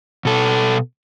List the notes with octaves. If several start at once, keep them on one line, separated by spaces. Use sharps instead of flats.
B2 A4